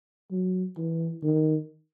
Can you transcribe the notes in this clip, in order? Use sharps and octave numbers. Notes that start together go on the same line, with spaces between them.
F#3
E3
D#3